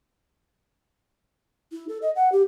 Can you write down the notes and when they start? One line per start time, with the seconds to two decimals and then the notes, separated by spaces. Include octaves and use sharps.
1.72 E4
1.89 A4
2.02 D#5
2.16 F#5
2.32 G4